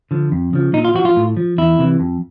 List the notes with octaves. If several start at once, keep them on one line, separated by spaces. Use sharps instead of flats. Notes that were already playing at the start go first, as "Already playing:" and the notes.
D3 F3
F2
C#3 F3
A#2 D#4
F4
F3 F#4
F4
A2
F3
E2 E4
C3 E3
F2